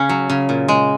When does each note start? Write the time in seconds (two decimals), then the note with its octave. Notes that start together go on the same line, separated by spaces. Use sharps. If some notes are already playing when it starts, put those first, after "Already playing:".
Already playing: C#3 C#4
0.09 F#3
0.29 C#3
0.49 A#2
0.68 G#3